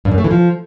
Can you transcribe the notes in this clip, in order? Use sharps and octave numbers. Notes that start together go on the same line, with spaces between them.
G2
F#2
A3
E3
F3